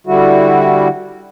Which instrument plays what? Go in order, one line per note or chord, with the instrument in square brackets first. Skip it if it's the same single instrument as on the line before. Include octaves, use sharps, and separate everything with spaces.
[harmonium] D3 G3 E4 F#4